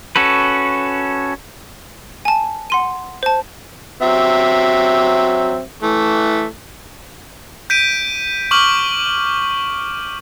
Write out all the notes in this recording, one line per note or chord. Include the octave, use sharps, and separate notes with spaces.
C#4 F#4 A4 B4
G#5 A5
F#5 C6 D#7
C5 A5
F#3 C4 E5
E3 A3
G6 B6 D7 D#7
C#6 D6 F6 F#7